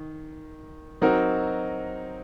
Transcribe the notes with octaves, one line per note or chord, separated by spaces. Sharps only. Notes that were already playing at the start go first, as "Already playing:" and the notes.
Already playing: D#3
F#3 C4 D#4 F#4 A#4